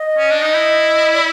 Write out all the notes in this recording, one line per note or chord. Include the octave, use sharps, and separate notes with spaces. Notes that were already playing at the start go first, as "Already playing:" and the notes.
Already playing: D#5
C#4
D4
D#4
E4
D5